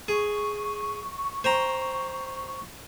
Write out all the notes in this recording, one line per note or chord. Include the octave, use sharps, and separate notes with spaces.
G#4 C#6
C5 G5 A#5